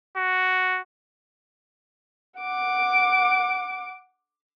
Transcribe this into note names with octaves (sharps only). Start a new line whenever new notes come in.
F#4
F#5 D6